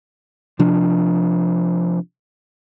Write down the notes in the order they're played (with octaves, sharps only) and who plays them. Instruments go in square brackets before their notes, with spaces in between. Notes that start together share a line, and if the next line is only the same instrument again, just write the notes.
[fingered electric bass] C3 F3 D4